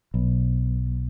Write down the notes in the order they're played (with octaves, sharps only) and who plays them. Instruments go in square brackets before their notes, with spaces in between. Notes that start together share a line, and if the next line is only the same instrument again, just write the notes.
[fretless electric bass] B1